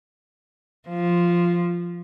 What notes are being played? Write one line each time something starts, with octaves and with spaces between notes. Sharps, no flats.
F3